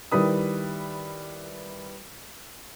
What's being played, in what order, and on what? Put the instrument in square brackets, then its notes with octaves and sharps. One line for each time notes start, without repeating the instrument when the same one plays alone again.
[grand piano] D#3 G3 E4 B4 D#6